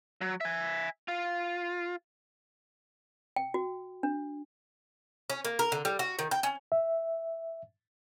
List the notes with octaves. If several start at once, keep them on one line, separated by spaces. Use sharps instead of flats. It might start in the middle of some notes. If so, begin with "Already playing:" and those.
F#3
E5 G#5
F4
G5
F#4
D4
C#4
A#3
A#4
D3
G3
F#4
D#3
G5
C#4
E5